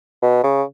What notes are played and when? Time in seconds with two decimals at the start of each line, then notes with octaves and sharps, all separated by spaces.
0.22 B2
0.44 C#3